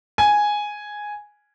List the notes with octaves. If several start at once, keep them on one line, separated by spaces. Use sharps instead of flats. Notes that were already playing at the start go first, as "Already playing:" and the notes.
G#5